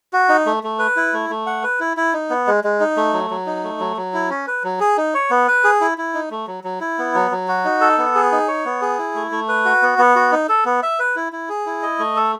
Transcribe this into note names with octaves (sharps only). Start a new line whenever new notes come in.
F#4
D#4
A3
A3
B4
E4
A3
A3
F#5
B4
E4
E4
D#4
B3
G#3
G#3
D#4
A3
F#3
F#3
D#4
A3
F#3
F#3
E4
C#4
B4
F#3
G#4
D#4
C#5
B3
B4
G#4
E4
E4
D#4
A3
F#3
F#3
E4
B3
F#3
F#3
F#4
D#4
A4
B3
G#4
D#4
C#5
B3
G#4
E4
A3
A3
B4
F#4
B3
B3
F#4
D#4
A4
B3
E5
B4
E4
E4
G#4
E4
D#5
A3
A4